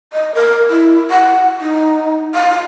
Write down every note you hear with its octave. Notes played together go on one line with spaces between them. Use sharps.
D#5
A#4
E4
F#5
D#4
F5